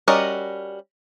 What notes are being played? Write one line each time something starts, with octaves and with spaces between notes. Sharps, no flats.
G3 C#4 F#4 A#4 D#5